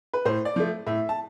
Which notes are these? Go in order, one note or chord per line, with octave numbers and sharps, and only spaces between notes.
B4
A2 C5
D5
F3 A3
A2 E5
A5